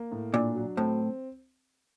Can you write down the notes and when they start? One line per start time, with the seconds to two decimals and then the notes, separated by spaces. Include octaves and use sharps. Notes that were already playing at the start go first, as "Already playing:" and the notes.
Already playing: A#3
0.12 A2
0.33 A#2 D4
0.56 F#3
0.77 A2 C4